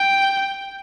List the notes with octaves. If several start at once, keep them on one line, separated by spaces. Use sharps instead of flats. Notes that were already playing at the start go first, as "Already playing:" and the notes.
Already playing: G5